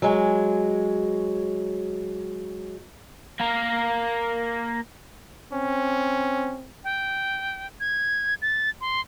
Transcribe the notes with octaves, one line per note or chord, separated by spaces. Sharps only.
F#3 G#3
A#3 A#4
C4 C#4
G5
G#6
A6
C6